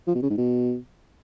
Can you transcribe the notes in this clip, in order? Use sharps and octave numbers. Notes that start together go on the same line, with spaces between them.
F3
B2
C#3
G#2
B2